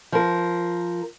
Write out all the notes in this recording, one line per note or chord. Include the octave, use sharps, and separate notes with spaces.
F3 A#4